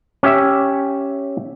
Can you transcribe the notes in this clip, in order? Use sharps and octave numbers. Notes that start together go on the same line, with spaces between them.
C#4 G4 E5